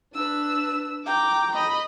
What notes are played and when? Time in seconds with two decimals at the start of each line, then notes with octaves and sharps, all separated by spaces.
0.14 D4 B4 E6
1.06 G5 A#5 D6
1.55 D#5 B5